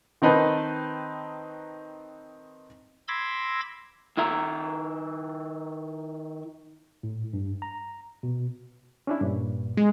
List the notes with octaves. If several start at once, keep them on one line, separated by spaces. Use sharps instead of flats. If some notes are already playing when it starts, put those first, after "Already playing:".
D#3 C4 D#4 B4 A5
B5 C6 D6 E6 G#6 A#6
D#3 E4 E5 A#5
A2
G2
A#5
B2
C#4 D4 E4
G2 A#2
G#3